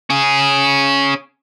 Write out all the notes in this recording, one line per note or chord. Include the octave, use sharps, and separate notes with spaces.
C#4 G#4